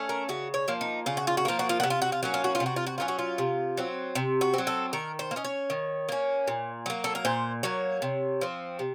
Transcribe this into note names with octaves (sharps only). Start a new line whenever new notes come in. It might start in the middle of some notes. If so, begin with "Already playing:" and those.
Already playing: A3 C#4
A#4
C#3 F#4
C#5
F3 A#3
D#4
C#3 F4
F#4
F4
F#4
F3 A#3 F4
F#4
F4
C3 F#4
F4
F#4
F4
F#3 A#3 C#4 F#4
F4
F#4
F4
C3
F#4
F4
F#4
F#3 A#3 C#4 F4
F#4
F4
C3
F#3 C4
C3
F#4
F#3 C4
A4
D#3 A#4
C5
A#3
C#4 D#5
C#5
D#3
A#3 C#4
A#2
F#3 A#3
A4
A#4
A#2 C5
F#3 A#3 C#5
C3
F3 C4
C3